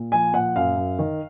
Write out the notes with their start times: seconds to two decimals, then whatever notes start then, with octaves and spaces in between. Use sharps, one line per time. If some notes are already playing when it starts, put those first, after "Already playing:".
Already playing: A#2
0.12 F3 G#5
0.33 A#2 F#5
0.56 F#2 F5
0.76 F#2
0.99 D#3